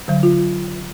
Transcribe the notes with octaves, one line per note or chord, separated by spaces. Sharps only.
D3 F#3
F4